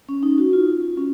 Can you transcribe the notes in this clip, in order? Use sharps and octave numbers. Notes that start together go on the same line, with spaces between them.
C#4
D#4
F#4
F4
C#4